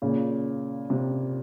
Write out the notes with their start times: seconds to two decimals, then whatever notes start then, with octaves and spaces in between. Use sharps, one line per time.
0.02 A#2 C#3
0.90 C3